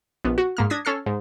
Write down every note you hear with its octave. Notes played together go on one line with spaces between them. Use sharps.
A#1 B3
F#4
G#2 A#3 F6
D4 D#6 G#6 A#6 B6
C#4 A4 F6 C7
G#2